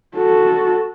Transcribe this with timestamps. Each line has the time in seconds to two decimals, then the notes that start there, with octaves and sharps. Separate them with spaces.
0.17 F#4 A4